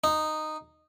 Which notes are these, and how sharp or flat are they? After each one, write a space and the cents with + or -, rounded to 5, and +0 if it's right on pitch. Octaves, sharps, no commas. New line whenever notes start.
D#4 -10